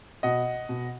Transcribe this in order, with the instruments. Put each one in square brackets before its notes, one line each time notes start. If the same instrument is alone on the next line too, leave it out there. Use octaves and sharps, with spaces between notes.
[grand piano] B2 D#5 F#5
B2